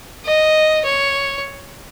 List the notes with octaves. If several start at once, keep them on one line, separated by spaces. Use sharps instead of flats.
D#5
C#5